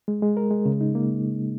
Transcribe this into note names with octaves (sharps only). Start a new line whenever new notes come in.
G#3
G#3
A#4
G#3
C#3
D#4
A#3